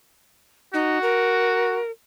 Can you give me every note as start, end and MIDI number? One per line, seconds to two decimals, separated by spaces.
0.74 0.98 63
0.74 1.78 66
1.02 1.91 70